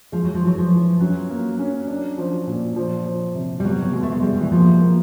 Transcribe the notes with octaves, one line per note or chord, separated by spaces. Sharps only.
F3 G#3
F#3
F3
E3 F#3
F3
E3
F#3 C#4
A#3
C#4
D4
F3
A#2
F3
F3
C3
G3
B2 F#3
B2 G#3
A3
G#3
G3 G#3
E3
F3 A#3
A#3